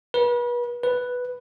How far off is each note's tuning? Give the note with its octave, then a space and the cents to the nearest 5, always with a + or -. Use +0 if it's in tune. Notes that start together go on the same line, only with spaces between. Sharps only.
B4 -35
B4 +0